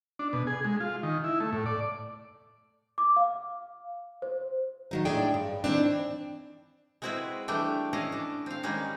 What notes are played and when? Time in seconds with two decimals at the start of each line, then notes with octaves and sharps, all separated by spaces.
0.19 D4
0.33 B2
0.47 G#4
0.65 G#3
0.81 F4
1.03 D#3
1.24 E4
1.40 A3
1.53 A2
1.66 D5
2.98 D6
3.16 F5
4.22 C5
4.91 D#3 F#3 D#4
5.05 A2 G#3 D4 G#4 D5 G5
5.34 G2
5.64 D#3 E3 C4 D4
7.02 G#3 C4 E4 F#4 G#4 B4
7.48 E3 G3 A3 D4 G5
7.93 C#4 E4 D#5 F5
8.12 D4
8.46 C4 F5
8.63 D#3 G3 G#3 A#3 C#4 D#4